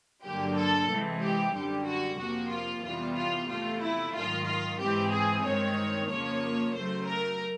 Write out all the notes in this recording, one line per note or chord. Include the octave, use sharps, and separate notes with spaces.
G2 D3 F#3 A#3 G4
A4
C3 E3 G#3 C4
G4
F#2 D3 G3 G4
F#4
F2 C3 F3 A#3 F#4
F4
F2 C3 E3 G3 B3 F4
F4
E2 C3 F3 A3 F4
E4
G#2 D#3 F#3 F4
F4
G#2 E3 G#3 C4 G4
G#4
G2 D#3 G#3 C4 C#5
F2 C#3 F3 A#3 C#5
F#2 C#3 F#3 A3 C5
A#4